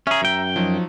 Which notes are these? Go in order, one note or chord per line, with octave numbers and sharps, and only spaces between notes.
C#4 G#4 E5 A#5
F#2 G5
F3 F#3 D#4